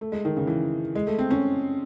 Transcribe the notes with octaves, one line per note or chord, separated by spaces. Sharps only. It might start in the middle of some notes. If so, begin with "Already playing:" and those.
A3
G#3
D#3
C#3
E3
G#3
A3
C4
C#4